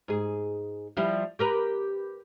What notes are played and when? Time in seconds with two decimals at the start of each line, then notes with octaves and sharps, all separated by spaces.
0.08 G#2 G#4
0.97 F3 G3 E4
1.39 G4 A#4 B4